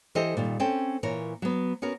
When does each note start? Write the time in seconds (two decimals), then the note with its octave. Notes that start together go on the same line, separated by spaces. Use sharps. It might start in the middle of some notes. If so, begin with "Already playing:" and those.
0.15 E3 G4 A4 C5 D#5
0.37 A#2 D#3 G3
0.60 C4 C#4 A4 G5
1.03 A#2 E3 A#4 C#5
1.42 F#3 B3
1.82 B3 C#4 F#4 A#4